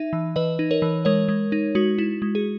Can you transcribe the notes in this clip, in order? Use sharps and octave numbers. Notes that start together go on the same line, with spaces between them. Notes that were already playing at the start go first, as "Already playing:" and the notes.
Already playing: D#4 E5
E3
E3 B4 D#5
D#4
A#4 C#5
E3
G#3 A#4 C#5
G#3
D#4
G#3 F#4
E4
G#3
G#4